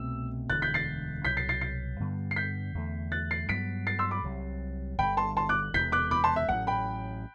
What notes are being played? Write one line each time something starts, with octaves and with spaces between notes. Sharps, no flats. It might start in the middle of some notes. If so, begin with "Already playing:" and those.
Already playing: C2 B2 A3 C4 E6
E1 D2 D3 F#6 A6
G6 B6
A6 C7
C2 B2 F#3 G6 B6
A6 C7
A6 C7
A6 C7
G2 D3 G3 B3
C7
G6 B6
E2 D3 A3
F#6 A6
A6 C7
G2 F#3 B3 B6 D7
A6 C7
C6 E6
B5 D6
C2 C3 F#3
G1 G2 D3 G5 B5
A5 C6
A5 C6
D6 F#6
E1 E2 C3 E3 G6 B6
D6 F#6
B5 D6
A5 C6
E5
A1 A2 F#3 F#5
G5 B5